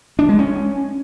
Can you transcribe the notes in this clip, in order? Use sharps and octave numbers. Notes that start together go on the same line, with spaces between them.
D4
G#3
C#4